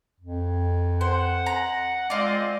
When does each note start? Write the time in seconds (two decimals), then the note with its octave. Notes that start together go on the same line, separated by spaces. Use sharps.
0.20 F2
1.01 C5 F#5
1.46 A#5
2.10 G#3 C4 F4 D5 D#5